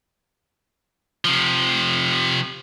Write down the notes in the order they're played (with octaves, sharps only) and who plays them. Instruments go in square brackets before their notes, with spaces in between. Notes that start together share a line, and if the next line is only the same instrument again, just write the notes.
[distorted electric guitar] C3 F3